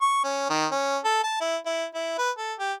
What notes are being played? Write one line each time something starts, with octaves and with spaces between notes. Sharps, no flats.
C#6
C#4
D#3
C#4
A4
A5
E4
E4
E4
B4
A4
G4